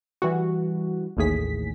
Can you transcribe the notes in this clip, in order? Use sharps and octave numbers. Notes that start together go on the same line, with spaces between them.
E3 G3 F#4
A1 D#2 A2 G#4 B6